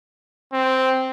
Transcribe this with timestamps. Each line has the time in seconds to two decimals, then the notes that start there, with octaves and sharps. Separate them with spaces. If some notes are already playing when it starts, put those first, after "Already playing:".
0.53 C4